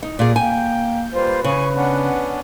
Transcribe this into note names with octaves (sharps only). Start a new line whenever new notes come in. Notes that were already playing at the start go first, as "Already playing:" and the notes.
D#4
A#2 G#4 D5
A#3 G5 G#5 G6
G3 A#3 F4 B4 C5
C#3 G#5 C#6
B3 C#4 D4 F#5